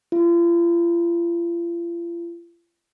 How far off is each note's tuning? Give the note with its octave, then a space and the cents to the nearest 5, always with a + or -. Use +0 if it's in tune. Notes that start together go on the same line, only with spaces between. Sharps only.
F4 -40